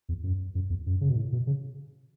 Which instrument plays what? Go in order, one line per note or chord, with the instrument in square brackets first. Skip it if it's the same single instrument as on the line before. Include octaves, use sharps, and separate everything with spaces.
[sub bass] E2
F#2
F#2
E2
F#2
C#3
B2
A2
B2
C#3